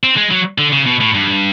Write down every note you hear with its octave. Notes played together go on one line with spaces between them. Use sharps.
C4
G#3
F#3
D3
C#3
B2
A2
G2